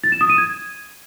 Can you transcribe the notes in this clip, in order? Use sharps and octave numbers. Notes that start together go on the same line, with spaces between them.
A6
E7
D#6
D#7
G#6